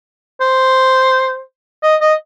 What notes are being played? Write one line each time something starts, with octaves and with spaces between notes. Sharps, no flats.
C5
D#5
D#5